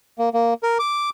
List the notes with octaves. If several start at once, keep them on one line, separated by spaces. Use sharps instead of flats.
A#3
A#3
A#4
D6